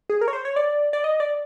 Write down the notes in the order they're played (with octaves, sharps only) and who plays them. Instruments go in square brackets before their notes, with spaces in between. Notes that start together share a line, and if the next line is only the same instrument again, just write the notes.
[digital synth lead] G#4
A#4
C#5
C5
C#5
D5
D5
D#5
D5